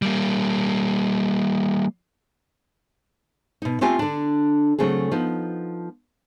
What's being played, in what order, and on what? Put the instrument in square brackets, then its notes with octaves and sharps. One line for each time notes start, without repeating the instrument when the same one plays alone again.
[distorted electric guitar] G3 A#3
[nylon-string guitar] B2 D#4
A3 C4 F4 G4 G#5 A5
D3 D4
C#3 F#3 A3 C4 G#4
F3 B3 D#4